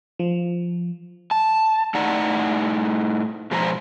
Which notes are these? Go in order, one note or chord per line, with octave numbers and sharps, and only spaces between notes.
F3
A5
A2 D#4 D5 F#5 A#5
G#2 B2 F3 C5 G#5 A#5